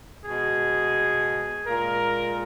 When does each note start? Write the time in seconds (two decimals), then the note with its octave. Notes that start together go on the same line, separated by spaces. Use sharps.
0.25 B2 G#3 G#4
1.67 A#2 G#3 A#4